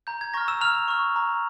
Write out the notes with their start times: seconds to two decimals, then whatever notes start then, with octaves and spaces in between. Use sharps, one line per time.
0.07 A#5 G6
0.21 G#6
0.34 A#5 C#6 F6 A#6
0.48 E6 E7
0.61 A#5 F6 F7
0.88 C#6 F6
1.16 A#5